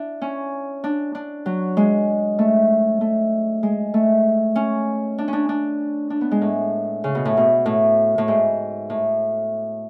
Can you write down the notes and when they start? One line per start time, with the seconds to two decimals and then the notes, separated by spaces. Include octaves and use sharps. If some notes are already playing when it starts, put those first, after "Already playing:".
Already playing: D4 E4
0.22 C#4
0.84 D4
1.15 D4
1.46 F#3
1.77 G#3
2.39 A3
3.01 A3
3.63 G#3
3.94 A3
4.56 C#4
5.18 D4
5.28 C#4
5.33 D4
5.49 D4
6.10 D4
6.21 B3
6.31 G#3
6.41 A2
7.04 C#3
7.15 B2
7.25 A2
7.37 B2
7.66 A2
8.18 A2
8.28 G#2
8.90 A2